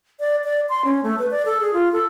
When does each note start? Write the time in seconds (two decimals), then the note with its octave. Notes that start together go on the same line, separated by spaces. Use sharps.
0.20 D5
0.44 D5
0.69 C6
0.85 C#4
1.03 A3
1.19 B4
1.31 D5
1.45 A4
1.61 G#4
1.74 F4
1.93 A4